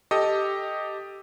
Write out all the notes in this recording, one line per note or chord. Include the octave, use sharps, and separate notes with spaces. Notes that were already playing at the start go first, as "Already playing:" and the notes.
G4 A4 D#5